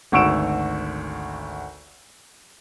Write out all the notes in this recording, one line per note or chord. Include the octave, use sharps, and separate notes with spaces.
G#1 D2 C#6 E6 D7 E7